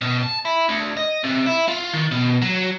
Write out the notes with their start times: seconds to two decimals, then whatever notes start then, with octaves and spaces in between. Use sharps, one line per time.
0.02 B2
0.23 A5
0.45 E4
0.69 D2
0.97 D#5
1.24 C3
1.46 E4
1.68 F4
1.93 D#3
2.11 B2
2.42 F#3